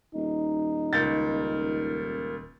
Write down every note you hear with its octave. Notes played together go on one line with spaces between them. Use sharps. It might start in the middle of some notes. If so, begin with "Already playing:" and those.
D#1 D#4
C#2 A#4 G6 A6